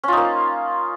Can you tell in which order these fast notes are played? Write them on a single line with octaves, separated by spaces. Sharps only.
C#4 F4 D#4 A#3